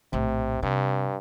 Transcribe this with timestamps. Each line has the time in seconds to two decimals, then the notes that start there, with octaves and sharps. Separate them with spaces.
0.13 A#1 A2 C3
0.63 G2 C3